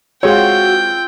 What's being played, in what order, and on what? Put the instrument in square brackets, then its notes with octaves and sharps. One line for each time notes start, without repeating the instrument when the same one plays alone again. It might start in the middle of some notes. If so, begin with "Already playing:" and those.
[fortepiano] G#3 C#5 [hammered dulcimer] C4 F4 [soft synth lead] F#4 [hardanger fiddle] G5